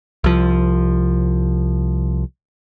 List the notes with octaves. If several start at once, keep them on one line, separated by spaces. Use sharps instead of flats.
C2 F3